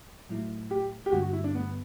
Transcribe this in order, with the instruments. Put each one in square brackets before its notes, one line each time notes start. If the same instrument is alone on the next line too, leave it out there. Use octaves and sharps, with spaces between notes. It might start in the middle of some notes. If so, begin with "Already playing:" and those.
[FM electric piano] A2 F#3 A3 E4
[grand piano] G4
G4
[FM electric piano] G2 D3 G3 [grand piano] F#4
[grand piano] F#4
E4
D4
B3